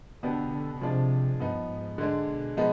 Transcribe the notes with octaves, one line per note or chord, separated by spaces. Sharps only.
B2 D3 B3 D4 G4
D3
C3 F3 G#3 D4 F4
G2 F3 B3 D#4
G#2
D3 G#3 D4
B2
F3 G#3 B3 D#4